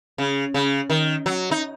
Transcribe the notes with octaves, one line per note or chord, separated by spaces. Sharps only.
C#3
C#3
D#3
F#3
D#4